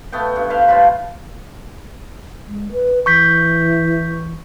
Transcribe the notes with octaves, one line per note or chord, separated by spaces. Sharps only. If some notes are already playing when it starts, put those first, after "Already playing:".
A3 B3 G5
G2
B4 C5 F5 G5
A2 F4 B5
G#3
B4
E3 C#6 G6 B6